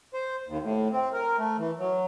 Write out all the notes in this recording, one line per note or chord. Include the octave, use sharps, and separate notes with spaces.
C5
D#2
A2
C4
A#4
A3
E3
F#3